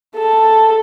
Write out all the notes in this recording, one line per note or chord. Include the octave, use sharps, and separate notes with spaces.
A4